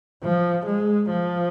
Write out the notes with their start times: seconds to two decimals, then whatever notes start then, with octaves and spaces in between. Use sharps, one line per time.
0.23 F3
0.66 G#3
1.09 F3